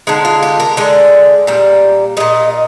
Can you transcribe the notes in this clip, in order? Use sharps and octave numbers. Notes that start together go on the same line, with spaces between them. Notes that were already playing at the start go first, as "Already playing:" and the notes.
D3 G#3 D#4
F4
G4
A#4
D3 G#3 D5
A#2 G3
A#2 G3 D#5